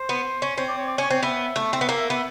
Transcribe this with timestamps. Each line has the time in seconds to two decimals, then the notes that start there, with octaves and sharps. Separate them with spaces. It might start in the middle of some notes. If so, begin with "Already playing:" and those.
Already playing: C5
0.09 B3
0.42 C#4
0.57 C4 C#5
0.68 D5
0.78 C#5
0.87 D5
0.97 C#4 C#5
1.10 C4
1.23 B3 E5
1.56 A3
1.73 C4
1.81 B3
1.89 A#3
2.10 B3